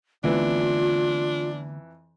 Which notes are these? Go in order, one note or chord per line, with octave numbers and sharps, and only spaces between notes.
F2 D3 E3 A3 B3 D4 F4